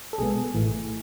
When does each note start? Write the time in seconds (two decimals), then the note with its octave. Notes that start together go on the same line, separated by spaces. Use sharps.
0.13 A4
0.18 B1 B2 G#3 B3 G#4
0.54 A1 A2 E3 A3